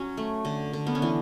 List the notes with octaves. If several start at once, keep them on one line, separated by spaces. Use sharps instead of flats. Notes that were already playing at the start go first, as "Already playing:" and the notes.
Already playing: F#3 C#4
A3
D3
D3
B3
C#4
E3 D4